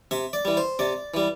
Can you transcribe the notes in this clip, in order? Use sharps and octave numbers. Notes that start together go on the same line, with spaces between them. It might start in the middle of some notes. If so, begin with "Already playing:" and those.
C3 E5
D5
E3 G3
C5
C3 D5
E3 G3